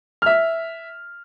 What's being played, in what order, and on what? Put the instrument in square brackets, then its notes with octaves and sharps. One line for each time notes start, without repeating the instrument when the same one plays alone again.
[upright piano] E5 F6